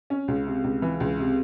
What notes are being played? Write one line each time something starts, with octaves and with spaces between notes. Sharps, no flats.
C#4
C#2
C3
C#2
E3
C#2
C3